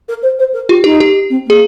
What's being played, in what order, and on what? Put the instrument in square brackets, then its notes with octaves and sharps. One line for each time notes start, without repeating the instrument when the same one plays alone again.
[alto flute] A#4
C5
C5
A#4
[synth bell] F4 [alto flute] G4
[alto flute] D#4 [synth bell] G4
[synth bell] G4
[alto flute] C4
[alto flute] A#3 [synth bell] G#4